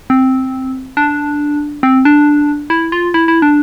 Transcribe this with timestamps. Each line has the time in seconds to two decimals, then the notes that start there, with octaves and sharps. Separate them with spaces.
0.10 C4
0.97 D4
1.83 C4
2.05 D4
2.70 E4
2.92 F4
3.14 E4
3.28 E4
3.42 D4